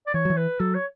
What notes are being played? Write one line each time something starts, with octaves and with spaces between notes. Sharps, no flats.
D5
E3 C#5
F#3
E3
B4
F#3 A4
C#5